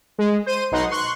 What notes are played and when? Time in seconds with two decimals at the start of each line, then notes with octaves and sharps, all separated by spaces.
0.18 G#3
0.46 C5 D#7
0.72 B1 B2 D#4 F#5 C6
0.90 C6 C#6 F#6